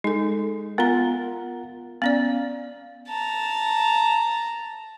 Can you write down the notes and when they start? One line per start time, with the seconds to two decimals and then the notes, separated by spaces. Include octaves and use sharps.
0.04 G#3 D#4 A4
0.78 B3 F4 A#4 F#5 A#5
2.02 B3 C#4 D5 F5
3.08 A5 A#5